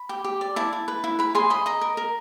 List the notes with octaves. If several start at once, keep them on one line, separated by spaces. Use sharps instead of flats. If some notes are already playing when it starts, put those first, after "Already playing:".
Already playing: B5
G4
G4
D5
E4 A5
E4
B4
E4
B4 B5
G#4 C6
D#5 B5
D#5 A#5
A#4
A#4